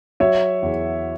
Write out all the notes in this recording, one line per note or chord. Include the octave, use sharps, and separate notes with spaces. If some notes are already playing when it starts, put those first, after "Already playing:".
F#3 C#5 E5
E2